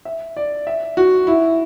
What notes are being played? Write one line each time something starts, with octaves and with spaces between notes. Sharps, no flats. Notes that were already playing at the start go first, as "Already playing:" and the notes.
E5
D5
E5
F#4
E4